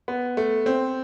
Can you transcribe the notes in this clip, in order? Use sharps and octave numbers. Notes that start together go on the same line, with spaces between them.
B3
A3
C4